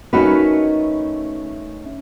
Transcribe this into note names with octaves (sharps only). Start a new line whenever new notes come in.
A3 C#4 D#4 F#4 A#4 B4